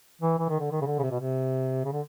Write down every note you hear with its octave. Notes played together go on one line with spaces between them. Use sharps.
E3
E3
D#3
D3
D#3
C#3
D3
C#3
C3
B2
C3
C#3
D3